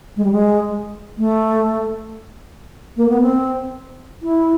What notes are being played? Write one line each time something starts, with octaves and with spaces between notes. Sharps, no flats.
G#3
G3
G#3
A3
A#3
B3
C4
E4